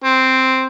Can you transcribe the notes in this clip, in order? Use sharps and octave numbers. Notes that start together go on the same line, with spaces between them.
C4